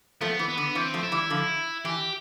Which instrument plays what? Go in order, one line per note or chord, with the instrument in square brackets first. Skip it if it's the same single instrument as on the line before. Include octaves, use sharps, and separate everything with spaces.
[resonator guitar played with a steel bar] F3 A3 [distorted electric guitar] B3
[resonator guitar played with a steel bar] E3
[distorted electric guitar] B3
[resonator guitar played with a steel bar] D3
[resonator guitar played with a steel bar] E3 [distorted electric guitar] C4
[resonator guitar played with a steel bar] F3 A3
[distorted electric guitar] E4
[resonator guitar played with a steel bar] E3 G3
D3 F3
[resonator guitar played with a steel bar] E3 [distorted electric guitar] G4